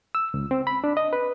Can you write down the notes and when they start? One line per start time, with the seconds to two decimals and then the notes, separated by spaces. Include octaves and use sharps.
0.15 E6
0.34 C#2
0.51 C4
0.67 B5
0.84 D4
0.97 D#5
1.13 B4